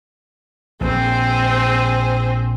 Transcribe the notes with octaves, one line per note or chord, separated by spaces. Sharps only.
A#1 C4 G#4 C5